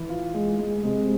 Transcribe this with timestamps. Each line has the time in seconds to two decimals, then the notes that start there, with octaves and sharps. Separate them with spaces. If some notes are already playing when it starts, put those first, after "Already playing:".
Already playing: E3
0.09 F4
0.34 G#3
0.58 G#3
0.83 C3 G#3